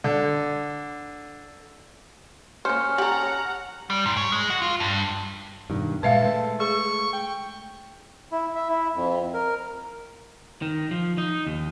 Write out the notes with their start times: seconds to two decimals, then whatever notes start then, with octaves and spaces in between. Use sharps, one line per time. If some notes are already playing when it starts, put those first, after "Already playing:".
0.04 D3
2.65 A#3 C#4 C5 F6 C#7
2.98 G4 A4 F#5 A#5 F#7
3.90 G3
4.06 G#2
4.17 C#5
4.32 G#3
4.50 F#4
4.62 F4
4.80 G2
5.70 G2 B2 D#3
6.03 A#2 G#3 B4 E5 F5 A5
6.21 G#3 A3
6.60 G#4 C#6
7.13 G5
8.32 E4
8.55 E5
8.69 E4
8.96 F2
9.34 A#4
10.62 D#3
10.91 F3
11.18 D#4
11.46 D#2